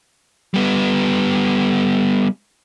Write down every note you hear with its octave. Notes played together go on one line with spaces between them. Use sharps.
G3 B3